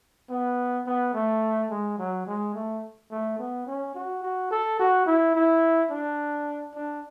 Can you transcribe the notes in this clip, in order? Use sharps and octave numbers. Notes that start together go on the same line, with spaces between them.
B3
B3
A3
G#3
F#3
G#3
A3
A3
B3
C#4
F#4
F#4
A4
F#4
E4
E4
D4
D4